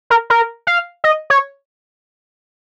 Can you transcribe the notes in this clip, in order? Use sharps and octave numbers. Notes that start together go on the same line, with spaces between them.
A#4
A#4
F5
D#5
C#5